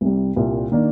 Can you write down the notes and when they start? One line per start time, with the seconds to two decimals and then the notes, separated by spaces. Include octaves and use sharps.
0.01 C2 C3 G3
0.36 C2 A#2 G3
0.72 D#3 A#3 D4